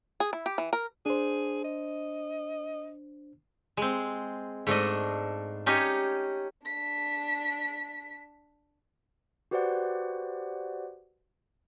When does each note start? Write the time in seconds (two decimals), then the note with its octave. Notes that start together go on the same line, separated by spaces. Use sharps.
0.20 G#4
0.33 E4
0.46 G4
0.58 E3
0.73 A#4
1.06 D4 G#4 C5
1.64 D#5
3.77 G#3 C4
4.67 G#2 A3 D4 D#5
5.66 C#4 D#4 G4 C#5 D#5
6.66 D4 B6
9.51 F#4 G4 B4 C5 D5 F#5